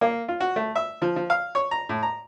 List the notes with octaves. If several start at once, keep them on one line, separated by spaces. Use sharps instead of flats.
A#3
F4
F#4
A3
E5
F3
F3
F5
C#5
A#5
A2
A#5